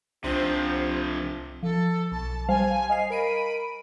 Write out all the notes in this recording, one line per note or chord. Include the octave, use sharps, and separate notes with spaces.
C2 C3 F3 D4 F4 C5 C6
F3 A4
B1 A5
G3 C5 F5 G#5
D#5 F5 C7
A#4 B5 D7 D#7